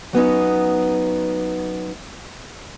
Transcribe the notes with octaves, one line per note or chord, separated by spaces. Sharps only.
F#3 B3 C#4 D#4